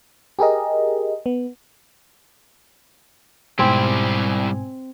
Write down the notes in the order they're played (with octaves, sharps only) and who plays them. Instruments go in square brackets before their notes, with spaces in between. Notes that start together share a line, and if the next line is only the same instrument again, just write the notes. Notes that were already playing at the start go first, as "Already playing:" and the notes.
[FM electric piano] G4 G#4 A#4 D#5
B3
[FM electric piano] G#2 B2 G#5 [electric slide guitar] G3 E4 G4 [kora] C4